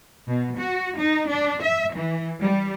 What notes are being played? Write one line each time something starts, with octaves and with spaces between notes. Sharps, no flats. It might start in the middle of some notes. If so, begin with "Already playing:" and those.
B2
F#4
D#4
D4
E5
E3
G3